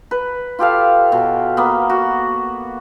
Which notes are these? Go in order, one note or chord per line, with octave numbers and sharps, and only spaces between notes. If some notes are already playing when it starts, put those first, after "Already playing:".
B4
F4 G4 A4 F5
B2
A#3 B3
F#4